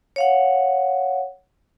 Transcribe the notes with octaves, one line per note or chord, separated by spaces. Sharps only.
C#5 F5 F#5